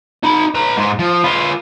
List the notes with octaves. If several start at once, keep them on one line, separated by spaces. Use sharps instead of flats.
D#4 B5
B4 A#5
G#2
F3
F4 B4